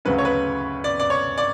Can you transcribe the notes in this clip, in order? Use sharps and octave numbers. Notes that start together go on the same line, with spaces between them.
D2 C#3 F#3 C#4 B4
C#5
B4
D5
D5
C#5
D5